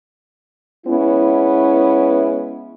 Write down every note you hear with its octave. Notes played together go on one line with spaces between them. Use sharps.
G#3 B3 C#4 E4